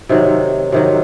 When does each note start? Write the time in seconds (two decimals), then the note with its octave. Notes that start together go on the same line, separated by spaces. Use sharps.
0.09 C3 D#3 F#3
0.72 C3 D#3 F#3